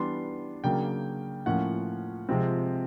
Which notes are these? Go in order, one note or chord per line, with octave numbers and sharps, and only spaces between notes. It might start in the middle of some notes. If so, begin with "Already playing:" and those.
Already playing: E3 G3 B3 D4 C6
C#3 F#3 A#3 D4 G5
A2 F3 A#3 C#4 F#5
C3 F3 G#3 C4